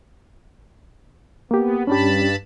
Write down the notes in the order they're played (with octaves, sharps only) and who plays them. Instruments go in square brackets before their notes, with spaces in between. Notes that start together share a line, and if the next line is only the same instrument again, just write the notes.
[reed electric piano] A#3 G4 [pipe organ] B3
[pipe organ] G2 A5 B5 [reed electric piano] C#4 D4 G4